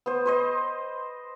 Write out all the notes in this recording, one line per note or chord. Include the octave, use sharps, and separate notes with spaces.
B3 C5
B4 C5 D#5